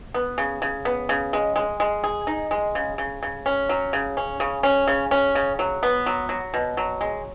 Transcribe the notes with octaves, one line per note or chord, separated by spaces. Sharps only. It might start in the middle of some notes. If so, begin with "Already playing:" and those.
B3
C#3
C#3
B3
C#3
G#3
G#3
G#3
G#4
D#4
G#3
C#3
C#3
C#3
C#4
F#3
C#3
C#4
C#3
C#4
C#3
C#4
C#3
F#3
B3
F#3
F#3
B2
F#3
G#3